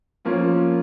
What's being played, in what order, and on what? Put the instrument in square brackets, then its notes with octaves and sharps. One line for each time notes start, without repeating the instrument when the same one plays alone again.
[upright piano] F3 A#3 C#4 F4